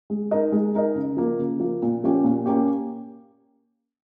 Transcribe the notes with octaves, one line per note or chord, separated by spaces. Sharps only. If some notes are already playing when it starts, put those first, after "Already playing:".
G#3
D#4 A#4 D#5
G#3
D#4 A#4 D#5
C#3
F3 A#3
C#3
F3 A#3
A#2
F3 A#3 C#4 G4
A#2
A#3 C#4 G4